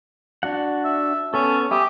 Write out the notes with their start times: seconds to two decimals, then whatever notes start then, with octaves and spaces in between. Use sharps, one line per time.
0.43 D4 F#4 F#5
0.84 E5
1.34 B3 C#4 A4
1.71 G4 E5 G#5 D#6